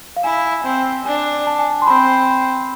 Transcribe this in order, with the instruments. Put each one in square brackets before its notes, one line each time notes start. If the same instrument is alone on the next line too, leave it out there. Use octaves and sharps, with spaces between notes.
[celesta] F5
[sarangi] E4 [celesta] G#5
[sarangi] C4
[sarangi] D4 [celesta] G#5
[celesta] A5
G#5
A5
C6
[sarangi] C4 [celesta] B5